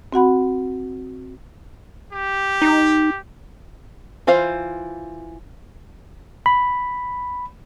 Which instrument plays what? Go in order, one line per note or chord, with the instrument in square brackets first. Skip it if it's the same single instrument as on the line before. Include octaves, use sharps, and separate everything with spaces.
[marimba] C4 F#4 F#5 B5
[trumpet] G4
[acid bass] D#4
[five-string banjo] E3 F4 C5 F5
[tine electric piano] B5